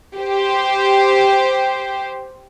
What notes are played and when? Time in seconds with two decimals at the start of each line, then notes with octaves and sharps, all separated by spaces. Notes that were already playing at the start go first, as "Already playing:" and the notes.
0.17 G4 C5